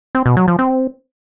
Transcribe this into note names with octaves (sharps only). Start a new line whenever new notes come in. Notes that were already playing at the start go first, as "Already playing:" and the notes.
C4
B2
F#3
F3
C4